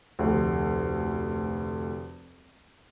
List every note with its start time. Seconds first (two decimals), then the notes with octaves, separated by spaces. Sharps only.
0.19 F1 D2